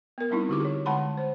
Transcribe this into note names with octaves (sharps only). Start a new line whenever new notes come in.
B3 A#4
G3 C4 D#4 E4
D3 F#4 G4 C#6 D6
G#4 C#5
D3 G#3 F#5 A5 B5 C6
C5